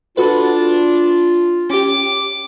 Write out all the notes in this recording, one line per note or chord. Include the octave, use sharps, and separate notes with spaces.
D4 F4 F#4 A4 B4
C#4 G4 D6